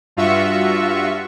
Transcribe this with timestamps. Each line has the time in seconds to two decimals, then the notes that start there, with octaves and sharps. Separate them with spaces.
0.17 G2 F4 F#4 E5 C#6